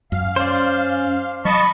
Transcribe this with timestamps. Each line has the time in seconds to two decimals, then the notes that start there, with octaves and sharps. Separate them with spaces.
0.12 F#2 F5
0.36 C#4 C5 D5
1.45 F#3 D#5 A5 B5 C#6